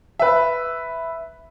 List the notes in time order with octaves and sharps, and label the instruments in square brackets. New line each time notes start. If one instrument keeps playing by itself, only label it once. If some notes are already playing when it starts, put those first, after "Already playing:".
[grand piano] B4 E5